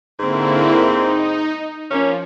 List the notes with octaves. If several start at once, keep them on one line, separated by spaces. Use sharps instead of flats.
G#2 D3 A#3 C4 E4
D#4
F3 A#3 C#4